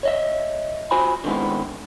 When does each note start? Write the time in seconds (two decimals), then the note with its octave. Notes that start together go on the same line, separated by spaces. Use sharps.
0.03 C#5 D#5 E5
0.91 F4 F#4 C5 G#5 B5
1.24 D3 D#3 G#3 B3 C4 E4